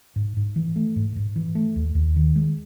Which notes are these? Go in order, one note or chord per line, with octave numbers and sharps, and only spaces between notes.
G#2
G#2
E3
A3
G#2
G#2
E3
A3
D#2
D#2
D#3
G#3